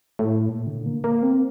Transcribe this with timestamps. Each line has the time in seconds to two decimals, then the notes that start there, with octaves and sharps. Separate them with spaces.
0.19 A2
0.48 A#2
0.67 D3
0.86 A#3
1.04 A#3
1.23 C4